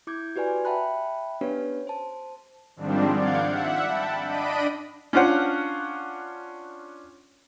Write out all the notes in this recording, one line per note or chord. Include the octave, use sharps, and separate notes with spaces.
E4 D6 G6 G#6
F#4 G4 B4 D5 G#5
E5 G5 A5 B5 F#6
B3 C#4 D4 G4 B4 C#5
C5 A5
G#2 D#3 F3 G3 C4 D4
D5 F5 F#5 G6 G#6
E5 F#5
G5 A5 B5
D4 D#5 B5 D7 D#7
C#4 D4 F4 C5 F#5